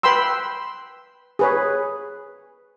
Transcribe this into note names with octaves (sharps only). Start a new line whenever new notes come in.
B4 G5 B5 C6 E6
G#4 B4 C#5